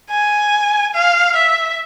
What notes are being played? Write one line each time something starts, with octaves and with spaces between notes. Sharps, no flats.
G#5
F5
E5